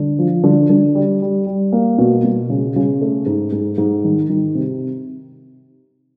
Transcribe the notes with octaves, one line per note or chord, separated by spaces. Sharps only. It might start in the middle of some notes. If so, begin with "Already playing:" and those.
Already playing: D3
F3
D3
D3
G3
G3
G3
A#3
B2
B2
C#3
C#3
A3
G#2
G#2
G#2
D#3
D#3
C3